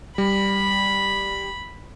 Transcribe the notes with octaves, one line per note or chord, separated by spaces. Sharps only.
G3 B5